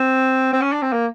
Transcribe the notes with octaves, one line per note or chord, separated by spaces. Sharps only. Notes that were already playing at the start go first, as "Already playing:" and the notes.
Already playing: C4
C4
C#4
D4
C4
A#3